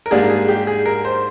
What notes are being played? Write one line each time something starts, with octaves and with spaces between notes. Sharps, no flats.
A#4
G#2 G3 A#3 D4 G#4
G#4
G4
G#4
A#4
C5